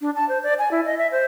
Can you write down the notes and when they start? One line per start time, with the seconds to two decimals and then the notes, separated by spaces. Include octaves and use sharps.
0.01 D4
0.15 A5
0.29 C5
0.43 D5
0.59 G#5
0.71 E4
0.86 D#5
0.98 E5
1.12 C5